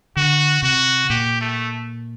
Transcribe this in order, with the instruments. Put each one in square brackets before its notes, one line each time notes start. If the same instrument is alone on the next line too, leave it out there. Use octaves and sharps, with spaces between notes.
[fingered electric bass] D3 [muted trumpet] F#4
[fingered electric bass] C3 [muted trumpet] F#4
[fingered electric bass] A#2 [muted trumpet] G4
[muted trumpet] A3